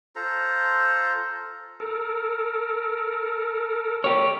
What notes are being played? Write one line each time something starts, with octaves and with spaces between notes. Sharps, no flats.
F4 A4 C5 A#5
A4 A#4
G4 C#5